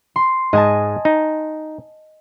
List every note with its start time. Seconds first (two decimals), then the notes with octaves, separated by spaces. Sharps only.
0.16 C6
0.53 G#2 G#3 D#5 G#5 A5
1.05 D#4